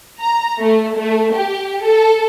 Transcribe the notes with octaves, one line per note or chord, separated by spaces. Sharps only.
A#5
A3
A3
G4
A4